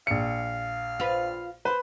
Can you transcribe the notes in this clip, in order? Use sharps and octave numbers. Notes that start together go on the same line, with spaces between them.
A#1 F5 C#7
F4 B4
B4 C5